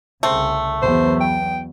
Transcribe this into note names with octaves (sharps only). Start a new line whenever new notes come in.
C2 C#3 A3 C4
E2 F#3 B3 C5
G5